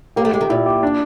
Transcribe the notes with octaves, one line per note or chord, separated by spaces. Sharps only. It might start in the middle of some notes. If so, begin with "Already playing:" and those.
A#3 G4
A3
G#3 G4
D#3
A#2 E4
G4
D4